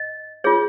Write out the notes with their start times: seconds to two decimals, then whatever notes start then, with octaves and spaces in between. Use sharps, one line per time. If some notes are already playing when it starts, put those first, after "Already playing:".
Already playing: D#5
0.44 F4 G#4 C#5